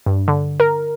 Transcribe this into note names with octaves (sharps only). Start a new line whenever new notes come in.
G2
D3
A#4